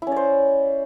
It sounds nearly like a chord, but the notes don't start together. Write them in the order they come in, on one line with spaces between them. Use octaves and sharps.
E4 C#4 D5 C5